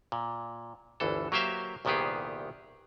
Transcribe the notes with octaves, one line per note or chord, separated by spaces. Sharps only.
A#2
G1 D2 E3 A4
F#3 A#3 G4 C5 E5 F5
C2 A#2 D#3 B3 G4 G#4